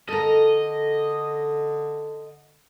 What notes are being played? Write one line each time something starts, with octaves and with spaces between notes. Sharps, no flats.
D3 A4 A#4 D#5